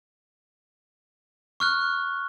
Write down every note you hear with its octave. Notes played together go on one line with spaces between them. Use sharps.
C#6 F6 F#6